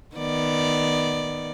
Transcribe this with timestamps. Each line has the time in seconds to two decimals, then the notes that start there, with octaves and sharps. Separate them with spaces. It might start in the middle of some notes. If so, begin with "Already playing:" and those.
0.16 D#3 B3 D5